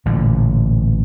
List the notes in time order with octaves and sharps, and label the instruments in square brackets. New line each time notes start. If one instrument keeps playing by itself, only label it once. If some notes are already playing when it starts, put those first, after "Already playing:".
[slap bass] A1 A#2 D3